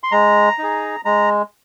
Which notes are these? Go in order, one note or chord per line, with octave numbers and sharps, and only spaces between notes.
C6
G#3 A#5
D#4 G#4
G#3 A#5